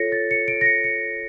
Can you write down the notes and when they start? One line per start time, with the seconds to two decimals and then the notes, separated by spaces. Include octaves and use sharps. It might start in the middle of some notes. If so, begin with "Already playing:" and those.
Already playing: F4 A4 C#5 A#6 C#7
0.12 A6
0.31 C#7
0.48 D7
0.61 A#6
0.66 C#7
0.84 C#7